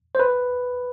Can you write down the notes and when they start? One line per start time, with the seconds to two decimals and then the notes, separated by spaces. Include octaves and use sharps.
0.15 C5
0.19 B4